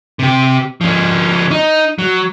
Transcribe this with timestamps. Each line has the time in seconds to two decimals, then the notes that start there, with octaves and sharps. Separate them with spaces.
0.19 C3 G4
0.81 F3 C#4
1.51 D#4
1.99 F#3